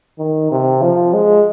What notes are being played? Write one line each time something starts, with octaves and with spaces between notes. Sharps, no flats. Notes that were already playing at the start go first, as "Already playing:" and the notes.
D#3
C3
F3
G#3